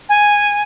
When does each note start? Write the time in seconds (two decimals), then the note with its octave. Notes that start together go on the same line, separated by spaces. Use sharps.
0.09 G#5